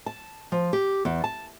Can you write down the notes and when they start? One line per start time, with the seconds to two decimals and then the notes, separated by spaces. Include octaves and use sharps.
0.06 A5
0.52 F3
0.73 G4
1.05 E2
1.24 A5